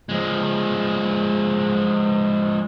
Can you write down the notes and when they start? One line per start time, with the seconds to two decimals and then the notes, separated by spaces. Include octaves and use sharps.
0.09 F3 G#3